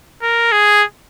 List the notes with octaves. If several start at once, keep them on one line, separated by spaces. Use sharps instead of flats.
A#4
G#4